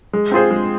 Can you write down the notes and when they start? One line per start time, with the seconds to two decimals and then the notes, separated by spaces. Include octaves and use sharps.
0.13 G#3
0.31 C4 F4 G#4 C5
0.51 G#3